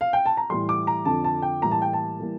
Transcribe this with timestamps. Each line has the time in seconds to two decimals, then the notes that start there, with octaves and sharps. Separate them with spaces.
0.01 F5
0.13 G5
0.26 A5
0.37 A#5
0.50 A2 E3 G3 C6
0.69 D6
0.87 A#5
1.05 F2 D3 F3 A5
1.24 A5
1.42 G5
1.61 A2 E3 G3 A#3 A#5
1.71 A5
1.82 G5
1.93 A5
2.19 E3 G3 A#3